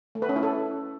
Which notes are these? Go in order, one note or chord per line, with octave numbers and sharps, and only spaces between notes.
A3
B4
C#4
E4
A4